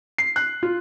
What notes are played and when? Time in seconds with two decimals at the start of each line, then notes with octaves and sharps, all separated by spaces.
0.18 C7
0.36 F#6
0.63 F4